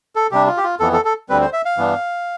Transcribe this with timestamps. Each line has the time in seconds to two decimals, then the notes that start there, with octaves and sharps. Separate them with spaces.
0.16 A4
0.31 C3 G3 D4 G4
0.48 F4
0.58 G4
0.64 F4
0.80 F2 E3 B3 A4
0.93 A4
1.05 A4
1.29 D2 D3 G3 C4 B4
1.42 C5
1.53 E5
1.65 F5
1.77 G2 E3 B3 D4